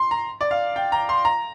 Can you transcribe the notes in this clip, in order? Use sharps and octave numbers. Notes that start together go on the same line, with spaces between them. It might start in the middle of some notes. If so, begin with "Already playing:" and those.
Already playing: C6
A#5
D5
F5
G5
A#5
C6
A#5